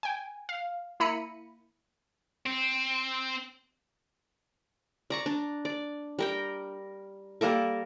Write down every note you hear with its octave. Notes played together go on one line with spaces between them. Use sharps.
G5 G#5
F5
A#3 E4 A#5 B5 C#7 D#7
C4
D5 A#5 C#6
D4
D5
G3 A#4 G5
G3 A#3 A4 A#4